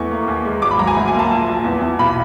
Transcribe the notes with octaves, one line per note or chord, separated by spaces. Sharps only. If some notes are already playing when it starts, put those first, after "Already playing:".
Already playing: E2 A3 C#6
A#3
D#2
G#3
G#1 D6
B5
F#3 A#5
G#5
D2
G#5
A#3 A5
A#1
A#1
E2
E2
B1 B5